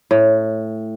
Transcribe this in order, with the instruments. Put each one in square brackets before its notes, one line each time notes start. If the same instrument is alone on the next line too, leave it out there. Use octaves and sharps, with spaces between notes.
[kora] A2